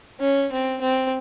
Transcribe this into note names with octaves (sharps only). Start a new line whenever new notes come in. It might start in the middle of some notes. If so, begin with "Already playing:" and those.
C#4
C4
C4